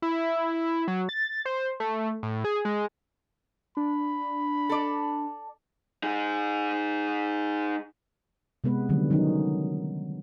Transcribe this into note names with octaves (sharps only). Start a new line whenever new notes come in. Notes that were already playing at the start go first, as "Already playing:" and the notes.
E4
F#3
A6
C5
A3
A2
G#4
G#3
D4 B5
A4 D5
D#4 G#4
C3 G#3 B3 B4
D3 D#3 F#3 G3
D#3 F#3 C#4 D#4